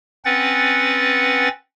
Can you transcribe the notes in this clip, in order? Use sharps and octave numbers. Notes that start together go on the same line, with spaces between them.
C4 C#4 B4 F#5 A6